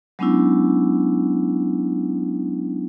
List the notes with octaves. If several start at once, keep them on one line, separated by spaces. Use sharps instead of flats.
F#3 G#3 B3 C#4 D4 E4